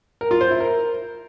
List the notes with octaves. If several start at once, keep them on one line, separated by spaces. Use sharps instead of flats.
A#4
F4
C5
E4
A#4